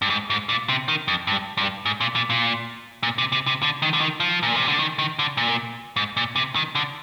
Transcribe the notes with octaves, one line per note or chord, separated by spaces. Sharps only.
G2
G#2
G#2
A#2
C3
D#3
F2
G2
G2
G#2
A#2
A#2
A#2
A#2
C3
C3
C3
D3
D#3
D3
D#3
F3
A#2
C3
D3
D#3
D#3
D3
A#2
G#2
A#2
C3
D#3
D3